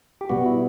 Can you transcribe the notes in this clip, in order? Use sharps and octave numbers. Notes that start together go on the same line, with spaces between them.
G4
B2 G3 B3 F#4
E4